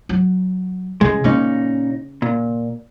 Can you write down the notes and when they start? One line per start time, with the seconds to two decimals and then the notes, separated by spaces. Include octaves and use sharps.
0.09 F#3
1.01 C#3 E3 G#3
1.24 A#2 C#3 C#4 D#4
2.22 A#2